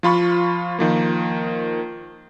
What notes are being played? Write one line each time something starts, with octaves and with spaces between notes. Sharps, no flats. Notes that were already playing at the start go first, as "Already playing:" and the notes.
F3 F4 B5 C#6
D#3 F3 A#3